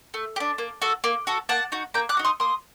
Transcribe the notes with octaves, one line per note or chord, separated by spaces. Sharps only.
A3
G4
D4
A#3
F#4 A4
A#3
F#4 A4
A#3 F#5 A5
D#4 F#4
A#3 G5 A#5
D6 F#6
D#4 F#4
C6 D#6
A#3 C6 D#6